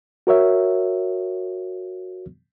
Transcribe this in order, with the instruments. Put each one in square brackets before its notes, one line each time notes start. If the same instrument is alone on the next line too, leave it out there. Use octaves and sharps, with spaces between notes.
[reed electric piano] F#4 A#4 C#5 E5